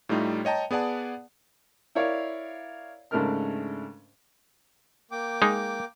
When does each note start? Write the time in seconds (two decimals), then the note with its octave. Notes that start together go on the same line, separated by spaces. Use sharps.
0.09 A2 G3 A3 D#4 F4
0.45 C#5 D#5 G5 A5 A#5
0.71 B3 G#4 D5 F#5 A5
1.95 E4 A#4 C#5 D5 F5
3.11 G#2 C#3 A3 D4 A#4 F6
5.11 A#3 G5 D6
5.42 G#3 D#4